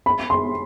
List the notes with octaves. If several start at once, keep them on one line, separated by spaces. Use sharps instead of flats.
B5
C6